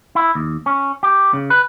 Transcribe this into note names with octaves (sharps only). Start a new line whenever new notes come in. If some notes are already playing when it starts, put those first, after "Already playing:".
E4
D#2
C#4
G4
C#3
B4